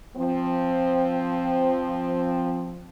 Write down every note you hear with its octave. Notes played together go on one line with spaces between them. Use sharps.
F3 C4